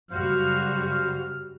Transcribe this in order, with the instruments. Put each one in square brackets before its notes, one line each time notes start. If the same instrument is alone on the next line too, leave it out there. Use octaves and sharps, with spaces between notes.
[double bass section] F#2 C#3 [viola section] G3 F#4 [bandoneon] C5 F5 [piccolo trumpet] F6